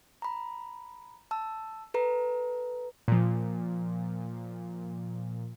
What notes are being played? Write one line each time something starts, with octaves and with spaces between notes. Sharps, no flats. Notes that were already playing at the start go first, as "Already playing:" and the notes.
A#5 B5
A5 E6
A4 B4 A#5
A#2 F3